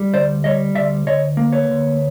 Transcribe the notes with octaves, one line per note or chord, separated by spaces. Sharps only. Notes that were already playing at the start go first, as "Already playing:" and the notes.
Already playing: G3
D2 C5 D5
G3 C#5 D#5
D2 D5 E5
D2 C#5 D#5
A#3
B4 C#5
D2